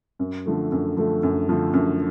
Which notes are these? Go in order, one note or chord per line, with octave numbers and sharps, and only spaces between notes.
F#2
D3 F3 A3
F#2
D3 F3 A3
F#2
D3 F3 A3
F#2